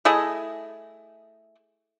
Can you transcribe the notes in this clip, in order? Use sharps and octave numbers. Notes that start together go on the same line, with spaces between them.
A3 E4 G#4 D#5